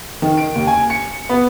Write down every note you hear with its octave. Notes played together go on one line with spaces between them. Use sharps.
D#3
D7
D#2
G#5
C#7
B3